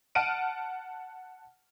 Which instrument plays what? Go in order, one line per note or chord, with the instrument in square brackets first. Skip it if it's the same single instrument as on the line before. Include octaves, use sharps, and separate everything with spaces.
[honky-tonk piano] F#5 A5 F6 D7 D#7